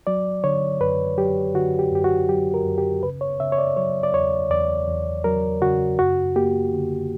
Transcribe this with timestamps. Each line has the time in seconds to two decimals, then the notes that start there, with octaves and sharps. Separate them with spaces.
0.07 F#3 D5
0.44 D3 C#5
0.81 F#2 B4
1.18 F#3 G4
1.54 D3 F#4
1.79 G4
1.91 F#2 G4
2.04 F#4
2.29 F#3 G4
2.54 A#4
2.65 F#2
2.78 G4
3.03 C#3 B4
3.21 C#5
3.40 C#3 E5
3.52 C#5
3.58 D5
3.77 F#3 C#5
4.03 D5
4.14 E2 C#5
4.50 E2 D5
4.88 E2
5.24 F#3 A#4
5.62 C#3 F#4
5.99 F#2 F#4
6.36 A#3 G4
6.73 D3